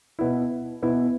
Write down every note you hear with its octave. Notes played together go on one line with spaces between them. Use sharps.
B2 B3 E4
B2 B3 E4